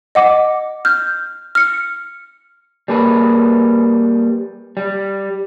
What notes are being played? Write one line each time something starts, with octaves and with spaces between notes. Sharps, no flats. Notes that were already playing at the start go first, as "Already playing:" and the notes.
D#5 F#5 D6
F6 G6
F6 C#7
G3 A#3 G#4 B4
G3